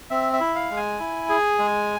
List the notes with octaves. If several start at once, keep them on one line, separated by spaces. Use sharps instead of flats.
C4 E5
E5
E4
F5
G#3
G#5
E4
G#4
G#3